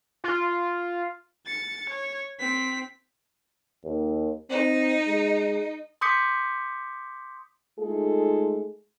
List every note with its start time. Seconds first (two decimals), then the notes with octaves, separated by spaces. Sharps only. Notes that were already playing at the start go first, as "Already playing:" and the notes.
0.24 F4
1.46 A6 C#7
1.89 C#5
2.39 C4 B6
3.85 D#2
4.50 C4 D#4
5.08 G#3
6.01 C6 D6 D#6 G6 B6 C#7
7.79 G#3 A3 D#4 F4 G#4 A4